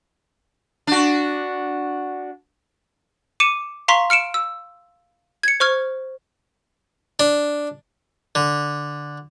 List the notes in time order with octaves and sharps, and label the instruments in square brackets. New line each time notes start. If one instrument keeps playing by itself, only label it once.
[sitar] D4 F#4
[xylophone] D6 C#7 D#7 E7
F5 A#5 C6 C#6 B6
F6 C#7 D7 E7
E6
G#6 C#7
C5 C#6 F6 G#6
[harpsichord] D4
D3